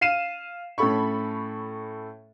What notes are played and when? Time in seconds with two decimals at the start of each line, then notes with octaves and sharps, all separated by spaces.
0.01 F5 C7 D#7 E7
0.78 A2 C#4 A4 B5 C#6